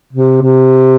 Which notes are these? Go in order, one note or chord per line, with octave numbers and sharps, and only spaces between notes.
C3
C3